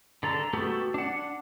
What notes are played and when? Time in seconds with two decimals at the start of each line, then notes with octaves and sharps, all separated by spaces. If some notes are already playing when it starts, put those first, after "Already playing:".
0.23 D3 A4 A#5
0.53 A3 B3 F#4 G4 A4
0.94 D4 F#5